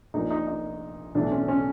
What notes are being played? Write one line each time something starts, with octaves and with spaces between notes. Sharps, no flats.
A#1 A#2 D#4
D#4
D#4
B1 A2 E3 D4
C#4
C#4